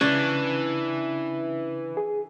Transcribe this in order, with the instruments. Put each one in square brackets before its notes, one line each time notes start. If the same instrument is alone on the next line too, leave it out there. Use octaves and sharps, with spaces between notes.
[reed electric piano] C#3 [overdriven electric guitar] E3 [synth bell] C#4 [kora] D4
[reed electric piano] G#4